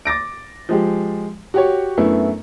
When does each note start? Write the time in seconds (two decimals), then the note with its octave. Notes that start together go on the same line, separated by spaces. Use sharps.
0.05 D6 A6 A#6 D7
0.69 F3 G#3 G4
1.54 F#4 G4 C#5
1.98 F#2 A3 B3 D4 E4